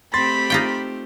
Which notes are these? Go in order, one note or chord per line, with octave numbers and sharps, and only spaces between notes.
A3 C4 G4 B5 C6 A6
D#4 F4 G5